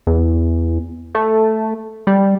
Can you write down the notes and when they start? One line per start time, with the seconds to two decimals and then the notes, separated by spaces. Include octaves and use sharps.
0.07 E2
1.15 A3
2.07 G3